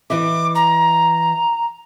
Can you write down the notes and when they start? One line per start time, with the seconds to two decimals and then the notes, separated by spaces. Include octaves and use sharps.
0.10 E3 D#5 E5 D6
0.55 A#5